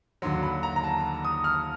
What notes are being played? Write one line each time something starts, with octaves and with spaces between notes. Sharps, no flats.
D#2 D3 F#3 C6
B5
A#5
A#5
A5
D#6
F6